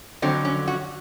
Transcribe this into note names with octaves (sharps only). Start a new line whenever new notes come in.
F2 D3 F#3 C4
C#4
F#4